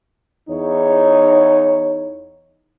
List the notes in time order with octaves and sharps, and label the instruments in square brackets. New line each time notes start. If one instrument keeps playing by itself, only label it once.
[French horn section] E2 D#4 C#5